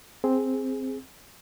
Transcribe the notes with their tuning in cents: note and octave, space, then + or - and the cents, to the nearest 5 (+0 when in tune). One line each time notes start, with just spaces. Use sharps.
C4 +0 G#4 +0